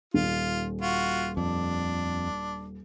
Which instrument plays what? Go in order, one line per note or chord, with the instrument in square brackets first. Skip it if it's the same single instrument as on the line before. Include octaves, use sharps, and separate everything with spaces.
[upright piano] D#1 [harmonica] F4
[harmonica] F4 F#4
[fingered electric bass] F2 [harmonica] D4